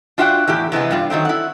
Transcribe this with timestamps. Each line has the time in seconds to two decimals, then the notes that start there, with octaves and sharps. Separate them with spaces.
0.18 D4 F4 F#4 E5 F#5 G5
0.48 E2 A2 E3 G4
0.72 C3 E3 G#3 B3
0.91 G2 G3 F4
1.10 D#3 F#3 A3 C4
1.25 E4 F#5